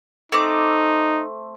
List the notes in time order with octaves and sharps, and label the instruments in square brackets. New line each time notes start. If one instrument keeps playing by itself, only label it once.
[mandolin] A3 C4 D6 [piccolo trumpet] D#4